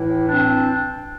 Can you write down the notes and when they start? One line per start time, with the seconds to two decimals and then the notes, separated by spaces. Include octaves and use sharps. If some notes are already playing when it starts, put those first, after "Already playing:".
Already playing: A2 E3 E4
0.29 C4 D4